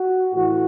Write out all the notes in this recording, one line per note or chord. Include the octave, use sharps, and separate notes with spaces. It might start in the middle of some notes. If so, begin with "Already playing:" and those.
Already playing: F#4
A2 E3 F#4